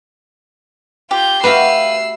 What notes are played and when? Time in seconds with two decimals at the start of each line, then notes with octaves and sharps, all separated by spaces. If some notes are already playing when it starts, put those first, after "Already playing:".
1.11 F4 G4 G6
1.44 A3 F#4 G4 B4 F5 E6 C7